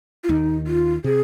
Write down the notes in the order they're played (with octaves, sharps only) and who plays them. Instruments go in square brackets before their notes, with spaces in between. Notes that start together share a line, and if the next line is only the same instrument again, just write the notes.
[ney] F4
[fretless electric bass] D#2 D#3 [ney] D#4
[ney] F4
[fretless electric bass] C3 [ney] G#4